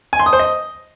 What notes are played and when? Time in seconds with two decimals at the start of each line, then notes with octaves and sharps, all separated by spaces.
0.13 G#5
0.19 C6
0.26 D#6
0.33 C5
0.39 D#5